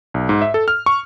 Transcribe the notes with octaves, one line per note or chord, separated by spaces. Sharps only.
B1
G#2
E5
A4
F6
C#6